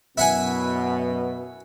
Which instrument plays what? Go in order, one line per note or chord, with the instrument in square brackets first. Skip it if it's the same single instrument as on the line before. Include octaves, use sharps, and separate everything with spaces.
[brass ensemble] F#2 B2 B3 [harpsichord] E4 F#5 G#5